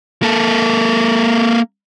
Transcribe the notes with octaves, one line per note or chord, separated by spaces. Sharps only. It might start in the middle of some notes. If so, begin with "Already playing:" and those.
A#3 A4